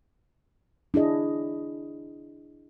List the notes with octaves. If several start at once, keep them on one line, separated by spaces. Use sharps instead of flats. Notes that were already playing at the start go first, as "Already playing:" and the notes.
D4 E4 G#4 D#5